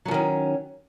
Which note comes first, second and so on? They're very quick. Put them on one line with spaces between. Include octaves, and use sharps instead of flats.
F#3 F3 D#3 C#4